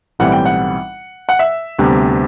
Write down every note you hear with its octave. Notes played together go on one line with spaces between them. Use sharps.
B1 A2 E3 G3 C4 F#5
G5
F#5
F#5
E5
D2 C3 G3 B3 D4